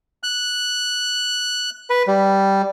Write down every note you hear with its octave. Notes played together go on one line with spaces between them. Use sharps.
F#6
B4
G3